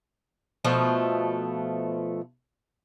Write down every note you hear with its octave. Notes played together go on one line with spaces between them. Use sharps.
B2 F3 A3